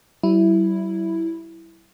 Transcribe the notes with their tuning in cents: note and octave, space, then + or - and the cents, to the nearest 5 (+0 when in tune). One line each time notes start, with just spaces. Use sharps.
G3 -45 E4 +0